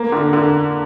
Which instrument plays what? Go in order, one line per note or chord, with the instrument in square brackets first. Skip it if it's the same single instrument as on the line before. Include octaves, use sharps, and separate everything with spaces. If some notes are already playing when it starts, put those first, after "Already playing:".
Already playing: [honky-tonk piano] A#3
D3
D3